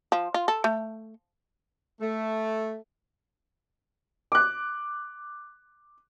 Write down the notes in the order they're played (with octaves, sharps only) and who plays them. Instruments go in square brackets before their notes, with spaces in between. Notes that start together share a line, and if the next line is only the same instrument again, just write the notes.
[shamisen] F3
F4
A4
A3
[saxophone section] A3
[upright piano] D6 F#6